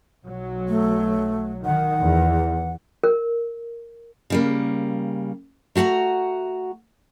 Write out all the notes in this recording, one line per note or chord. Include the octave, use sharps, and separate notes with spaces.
B1 F#3
A3
D#3 F#5
E2
A#4
C#3 G3 A#3
A3 F#4 F5 F#5 A#5